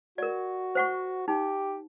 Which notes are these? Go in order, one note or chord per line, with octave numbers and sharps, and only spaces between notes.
F#4 A#4 D5
C5 F#5 C#6
D#4 G4